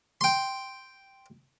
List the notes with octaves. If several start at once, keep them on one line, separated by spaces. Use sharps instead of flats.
G5 C6